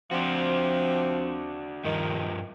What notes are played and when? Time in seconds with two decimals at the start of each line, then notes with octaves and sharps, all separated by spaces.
0.11 F3 C4 D4 F#4
1.84 G2 D#3 F3